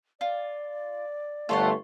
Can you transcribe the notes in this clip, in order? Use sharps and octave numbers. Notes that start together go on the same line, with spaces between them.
F4 D5
G1 A3 F4 A4 C#5 F#5 C6